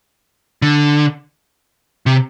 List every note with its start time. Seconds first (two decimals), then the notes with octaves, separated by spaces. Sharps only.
0.62 D3
2.06 C3